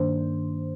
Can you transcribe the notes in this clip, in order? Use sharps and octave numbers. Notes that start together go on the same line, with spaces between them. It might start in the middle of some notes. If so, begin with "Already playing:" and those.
Already playing: G2 D#3 A#3 D4 C5